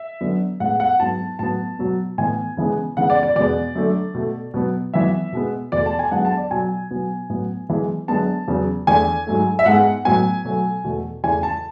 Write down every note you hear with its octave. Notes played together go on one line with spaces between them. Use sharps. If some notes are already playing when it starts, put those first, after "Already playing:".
Already playing: E5
F#2 D3 F#3 B3
A2 G#3 B3 F#5
F#5
G#2 F#3 B3 A5
A2 F#3 B3 A5
B2 F#3 B3
A2 E3 B3 G#5
C#3 E3 G#3 B3
C#3 E3 B3 F#5
D5
D5
E2 B2 G#3 B3 D5
F#2 D3 A3
B2 A3
B2 F#3 B3
F#2 E3 B3 E5
B2 G#3 B3
E2 B2 A3 D5
A5
G#5
F#2 D3 G#3 B3 F#5
A5
D5
B2 F#3 B3 G#5
B2 F#3 B3
A2 F#3 B3
F#2 E3 G#3 B3
F#2 D3 G#3 B3 A5
E2 C#3 F#3 B3
E2 D3 A3 G#5
G#2 F#3 A3
E5
G#2 G#3 B3 F#5
A2 F#3 B3 G#5
B2 F#3 A3
E2 B2 A3
E2 C#3 E3 A3 G#5
A5